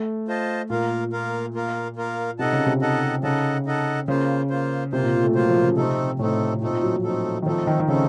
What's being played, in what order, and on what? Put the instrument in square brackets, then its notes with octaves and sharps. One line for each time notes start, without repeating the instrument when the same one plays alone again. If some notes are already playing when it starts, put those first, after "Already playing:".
Already playing: [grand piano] A3
[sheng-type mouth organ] F4 C5 D#5 A5
[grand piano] A#2 [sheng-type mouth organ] A#3 F4 A#4 F5
[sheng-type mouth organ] A#3 F4 A#4 F5
A#3 F4 A#4 F5
A#3 F4 A#4 F5
[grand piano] C3 [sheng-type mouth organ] D#4 A4 D#5 F#5 A5
[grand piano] C#3
C3
[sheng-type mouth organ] D#4 A4 D#5 F#5 A5
[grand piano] C#3 [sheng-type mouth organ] D#4 A4 D#5 F#5 A5
[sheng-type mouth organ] D#4 A4 D#5 F#5 A5
[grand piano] C#3 [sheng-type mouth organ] A#3 F4 C5
[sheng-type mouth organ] A#3 F4 C5
[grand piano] C3 [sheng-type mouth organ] A#3 F4 C5
[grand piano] A#2
A#2
A3
[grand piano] F#3 [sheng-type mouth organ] A#3 F4 C5
[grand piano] F3
C#3
[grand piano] C3 [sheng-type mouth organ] A3 C4 D#4 A4
[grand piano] A2 [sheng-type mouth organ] A3 C4 D#4 A4
[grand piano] A#2 [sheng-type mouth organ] A3 C4 D#4 A4
[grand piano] A#2
F#3
F3
[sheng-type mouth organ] A3 C4 D#4 A4
[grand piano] D#3
[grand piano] F3 [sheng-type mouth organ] A3 C4 D#4 A4
[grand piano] D#3
D#3
[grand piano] C#3 [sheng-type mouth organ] A3 C4 D#4 A4